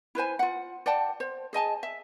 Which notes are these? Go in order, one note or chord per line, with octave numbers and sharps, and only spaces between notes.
E4 B4 C5 G#5
F4 F#5
D5 F#5 G5 A5
C5
G#4 D#5 G#5 A5
E5